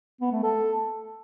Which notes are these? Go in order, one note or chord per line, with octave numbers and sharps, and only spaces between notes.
B3
A3
A4